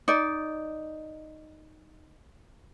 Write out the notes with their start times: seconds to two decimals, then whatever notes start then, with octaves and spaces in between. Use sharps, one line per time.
0.08 D#4 D5